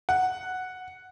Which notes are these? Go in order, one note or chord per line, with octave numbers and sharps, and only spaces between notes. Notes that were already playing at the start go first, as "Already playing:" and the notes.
F#5